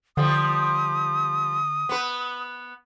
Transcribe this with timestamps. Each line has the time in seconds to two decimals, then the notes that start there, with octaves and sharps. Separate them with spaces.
0.17 D3 F3 G3 D#6
1.89 B3 B4